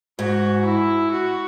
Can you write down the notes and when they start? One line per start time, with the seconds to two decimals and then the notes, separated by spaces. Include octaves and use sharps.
0.19 G#2 F#4
0.65 E4
1.11 F#4